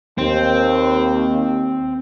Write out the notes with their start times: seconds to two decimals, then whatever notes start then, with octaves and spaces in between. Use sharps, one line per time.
0.18 D#2 C4